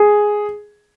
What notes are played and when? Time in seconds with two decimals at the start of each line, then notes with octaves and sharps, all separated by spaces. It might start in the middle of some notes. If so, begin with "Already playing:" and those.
Already playing: G#4